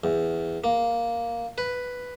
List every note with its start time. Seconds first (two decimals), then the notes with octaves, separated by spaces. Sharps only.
0.04 E2
0.64 A#3
1.58 B4